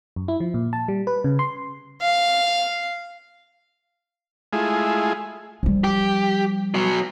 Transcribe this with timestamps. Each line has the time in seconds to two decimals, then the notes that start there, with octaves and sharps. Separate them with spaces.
0.16 F#2
0.28 E4
0.40 F3
0.54 A#2
0.73 A5
0.88 G3
1.07 B4
1.24 C#3
1.39 C6
2.02 F5
4.53 G#3 A3 E4 F4 G#4
5.63 F3 G3
5.84 G4
6.75 B2 F#3